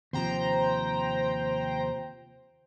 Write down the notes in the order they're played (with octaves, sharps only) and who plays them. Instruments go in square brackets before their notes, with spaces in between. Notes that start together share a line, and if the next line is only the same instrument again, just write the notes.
[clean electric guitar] D#2 C3 F3 [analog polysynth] C5 G5 A#5